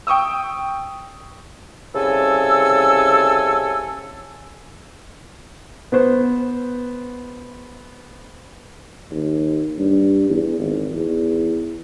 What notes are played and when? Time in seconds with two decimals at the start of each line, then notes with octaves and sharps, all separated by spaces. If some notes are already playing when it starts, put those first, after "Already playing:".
0.07 G5 C#6 D#6 E6
1.95 C2 C#3 A4 G#5 E6
5.92 B3 C5
9.11 D#2
9.79 G2
10.30 E2
10.59 G#1
10.92 E2